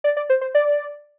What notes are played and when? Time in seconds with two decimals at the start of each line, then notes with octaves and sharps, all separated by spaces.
0.04 D5
0.17 D5
0.30 C5
0.41 C5
0.55 D5